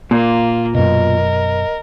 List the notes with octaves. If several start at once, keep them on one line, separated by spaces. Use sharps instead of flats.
A#2 A#3 F4
F#2 B2 A#4 D#5